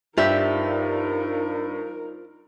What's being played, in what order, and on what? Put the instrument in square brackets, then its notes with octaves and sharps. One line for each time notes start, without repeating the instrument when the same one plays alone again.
[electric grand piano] G2 [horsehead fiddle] D#4 A#4 [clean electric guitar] F4 C5 D5 [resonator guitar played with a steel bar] G4 E5